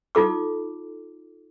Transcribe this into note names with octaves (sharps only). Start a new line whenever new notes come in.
D#4 F4 A4 D6